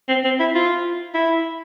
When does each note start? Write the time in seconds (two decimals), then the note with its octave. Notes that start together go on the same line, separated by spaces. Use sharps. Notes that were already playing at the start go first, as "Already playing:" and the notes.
0.08 C4
0.24 C4
0.40 E4
0.55 F4
1.14 E4